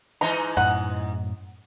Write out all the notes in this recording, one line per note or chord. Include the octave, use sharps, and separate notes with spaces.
G#2 E3 D#4 A#5
F#2 A2 F#5